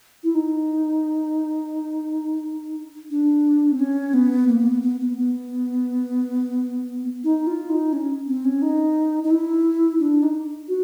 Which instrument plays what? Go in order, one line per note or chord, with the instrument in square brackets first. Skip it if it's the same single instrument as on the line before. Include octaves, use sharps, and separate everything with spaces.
[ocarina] E4
D#4
D4
C4
C#4
B3
A#3
A#3
B3
B3
B3
B3
D#4
F4
D#4
C#4
C4
C#4
D#4
D#4
E4
D4
D#4
F#4